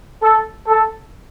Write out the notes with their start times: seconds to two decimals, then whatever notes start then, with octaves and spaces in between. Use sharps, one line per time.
0.22 A4
0.67 A4